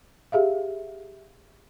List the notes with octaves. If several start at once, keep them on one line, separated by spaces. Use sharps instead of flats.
G4 G#4 E5 F5